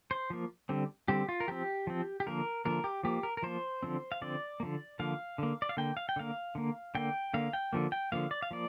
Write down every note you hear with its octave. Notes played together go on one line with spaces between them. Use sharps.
C5
F3 A#3
D3 G3 C4
D3 G3 C4 G4
F4
A#4
F3 C4 G4
F3 C4
G4
D3 F3 A#3 A#4
D3 F3 A#3 A#4
G4
F3 A#3 G4
A#4
A#4
F3 A#3 C5
D3 F3 C4
F5
D3 F3 C4 D5
A#3
D3 F3
D3 F3 A#3 F5
D3 A#3
D5
F5
D3 A#3 G5
F5
G5
D3 A#3 F5
D3 A#3
D3 A#3 G5
D3 A#3 F5
G5
D3 F3 A#3
G5
D3 F3 A#3 F5
D5
F5
F3 A#3 D5